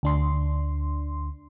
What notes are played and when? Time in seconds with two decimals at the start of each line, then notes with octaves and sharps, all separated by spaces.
0.03 D2 D4 C6